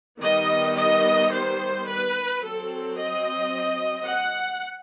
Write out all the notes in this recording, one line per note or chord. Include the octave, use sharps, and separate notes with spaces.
D#3 G3 B3 D#5
D#5
C5
B4
F#3 C4 A4
D#5
F#5